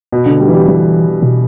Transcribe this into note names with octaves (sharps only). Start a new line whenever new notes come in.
B2
D3
G3
E3
G3
E3 G3
B2